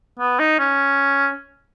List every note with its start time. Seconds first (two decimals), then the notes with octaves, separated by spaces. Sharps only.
0.19 B3
0.39 D#4
0.59 C#4